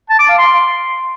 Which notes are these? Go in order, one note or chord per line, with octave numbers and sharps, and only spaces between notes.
A5
D6
F5
C6